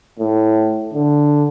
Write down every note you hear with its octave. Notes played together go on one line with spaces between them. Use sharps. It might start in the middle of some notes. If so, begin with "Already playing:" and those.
A2
D3